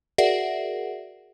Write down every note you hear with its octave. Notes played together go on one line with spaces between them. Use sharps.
F#4 G#4 A#4 D5 E5 F#5